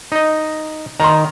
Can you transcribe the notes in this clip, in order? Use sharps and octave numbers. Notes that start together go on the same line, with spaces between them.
D#4 D#5
D#3 A#5 C6